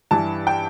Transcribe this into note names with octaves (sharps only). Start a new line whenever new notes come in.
G2 E3 A5
G5